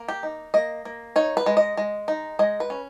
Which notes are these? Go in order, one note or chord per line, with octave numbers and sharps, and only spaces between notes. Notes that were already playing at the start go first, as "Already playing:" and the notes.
Already playing: A#3
G4
D#4
A#3 D#5
A#3
D#4 C#5
B4
G#3
D#5
G#3
D#4
G#3 D#5
B4
C#4